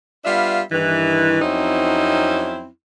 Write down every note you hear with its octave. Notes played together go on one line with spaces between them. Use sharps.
G3 B3 D4 F4 E5 F5
G2 D#3 E3
F2 F#3 C4 C#4 D#4 E4